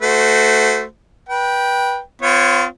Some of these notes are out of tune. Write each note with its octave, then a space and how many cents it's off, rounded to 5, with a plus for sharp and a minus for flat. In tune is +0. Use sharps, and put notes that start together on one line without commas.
A3 +0 F#4 +0 C5 -25
B4 -25 G5 +0
C4 -45 F4 +0 C#5 -15